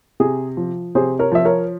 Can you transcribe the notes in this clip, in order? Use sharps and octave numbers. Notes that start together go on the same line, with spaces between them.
C3 G#4
F3
C3 G#4 C5
A#4 C#5
F3 E5
A#4 C#5